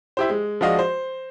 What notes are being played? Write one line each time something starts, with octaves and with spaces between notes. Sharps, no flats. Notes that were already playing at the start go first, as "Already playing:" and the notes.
E4 G4 C5
G#3
F3 G#3 D4 F#4 D#5 F5
C5